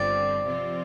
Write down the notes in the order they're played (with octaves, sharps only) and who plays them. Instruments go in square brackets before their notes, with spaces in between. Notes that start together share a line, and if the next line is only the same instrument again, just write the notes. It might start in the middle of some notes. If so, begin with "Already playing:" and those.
Already playing: [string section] G1 G2 D3 F3 C4 [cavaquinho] D5
[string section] C3 F3 C4 F4